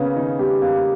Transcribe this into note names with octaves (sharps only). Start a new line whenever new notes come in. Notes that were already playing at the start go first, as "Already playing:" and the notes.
Already playing: C#3 A#3 B3 C#4
D#3 D#4
G3 G4
A#3